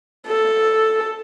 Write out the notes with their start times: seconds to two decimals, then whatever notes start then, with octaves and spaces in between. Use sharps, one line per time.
0.27 A4